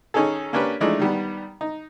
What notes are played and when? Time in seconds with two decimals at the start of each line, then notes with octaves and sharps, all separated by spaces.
0.14 D#3 C#4 D#4 G#4 A4
0.53 A#3 C#4 D4 G4 B4
0.80 E3 F3 G#3 A3 D4 D#4
0.99 D#3 G3 B3
1.61 D#4